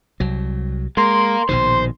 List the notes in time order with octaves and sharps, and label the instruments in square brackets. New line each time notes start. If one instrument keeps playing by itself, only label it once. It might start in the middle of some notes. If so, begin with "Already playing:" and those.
[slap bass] C2 F#3
[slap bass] G#3 [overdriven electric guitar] A#3 A#4 [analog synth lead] C6
[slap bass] A#1 B2 D#3 [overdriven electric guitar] C5